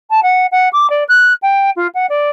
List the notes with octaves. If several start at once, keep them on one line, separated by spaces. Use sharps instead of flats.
A5
F#5
F#5
D6
D5
F#6
G5
F4
F#5
D5